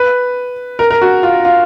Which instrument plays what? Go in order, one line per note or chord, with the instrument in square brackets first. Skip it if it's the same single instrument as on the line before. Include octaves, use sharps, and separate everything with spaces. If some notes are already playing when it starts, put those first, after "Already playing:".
Already playing: [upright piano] B4
A#4
A#4
F#4
F4
F4